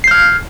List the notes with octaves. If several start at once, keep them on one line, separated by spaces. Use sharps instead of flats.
F6 G6 G#6 C7